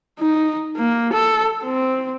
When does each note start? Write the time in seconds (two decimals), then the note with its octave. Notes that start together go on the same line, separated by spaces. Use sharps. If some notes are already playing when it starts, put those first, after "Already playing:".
0.19 D#4
0.77 A#3
1.13 A4
1.63 C4